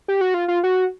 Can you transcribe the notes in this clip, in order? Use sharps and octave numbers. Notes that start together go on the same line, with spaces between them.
G4
F#4
F4
F4
F#4